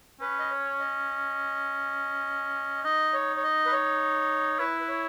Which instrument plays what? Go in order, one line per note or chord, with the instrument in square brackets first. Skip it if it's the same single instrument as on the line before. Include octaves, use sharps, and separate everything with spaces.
[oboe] C#4 [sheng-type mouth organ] B4
[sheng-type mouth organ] D#5
C#5
D#5
[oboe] D#4 [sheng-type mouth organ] D#5
[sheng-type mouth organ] C#5
C#5
D#5
B4
C#5
[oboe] E4 [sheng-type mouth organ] B4
[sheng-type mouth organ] B4
C#5